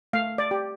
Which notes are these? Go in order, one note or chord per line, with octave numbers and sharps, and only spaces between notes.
A3 F5
D5
G4